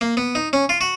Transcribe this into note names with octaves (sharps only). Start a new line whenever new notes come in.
A#3
B3
D#4
C#4
F4
F#4